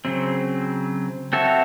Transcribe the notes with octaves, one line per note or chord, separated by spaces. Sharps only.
C#3 F#3 C4
C4 F#4 A4 C#5 E5